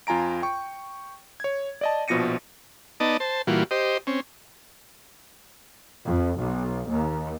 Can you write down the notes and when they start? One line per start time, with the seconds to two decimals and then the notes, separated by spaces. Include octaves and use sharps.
0.07 F2 F4 G#5 A#5 D7
0.42 G5 C#6
1.40 C#5 G#6
1.81 D5 D#5 A5
2.08 A#1 B2 F3 A#6 C#7 D#7
3.00 B3 D#4 D5 D#5 A5
3.20 C5 A5
3.47 A#2 E3 G3 F4 F#4
3.71 G4 C5 D#5
4.07 C4 C#4
6.06 F2
6.39 B1
6.88 D#2